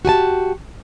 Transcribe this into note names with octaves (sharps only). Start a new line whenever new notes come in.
F#4 G4 G#5 A5